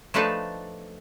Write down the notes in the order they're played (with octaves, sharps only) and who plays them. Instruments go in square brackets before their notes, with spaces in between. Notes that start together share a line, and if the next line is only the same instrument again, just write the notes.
[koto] F3 A3 D4 D#4 B4 A5